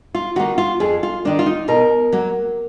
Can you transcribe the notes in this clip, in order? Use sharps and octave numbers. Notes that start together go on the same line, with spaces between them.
F4
D#3 A#3 F#4
F4
F2 G#4
F4
D#3 A#3 D4
F4
D#4
B2 A#4
F#3 A#3